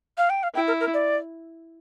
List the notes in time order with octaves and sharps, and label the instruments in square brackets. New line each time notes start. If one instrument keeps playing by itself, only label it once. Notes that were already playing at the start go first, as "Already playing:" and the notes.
[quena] F5
G5
F5
[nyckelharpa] E4 [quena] G5
[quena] A#4
A#4
D5